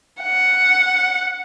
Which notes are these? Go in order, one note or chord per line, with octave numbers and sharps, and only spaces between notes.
F#5